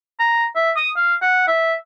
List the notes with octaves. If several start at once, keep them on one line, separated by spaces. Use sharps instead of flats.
A#5
E5
D#6
F5
F#5
E5